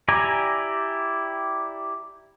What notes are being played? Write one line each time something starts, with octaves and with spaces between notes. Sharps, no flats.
E4 G4 D5 G#5 A#5